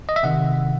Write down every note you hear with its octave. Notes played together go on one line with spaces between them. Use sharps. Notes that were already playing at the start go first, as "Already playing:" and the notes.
D#5
E5
C3 D#3 F#5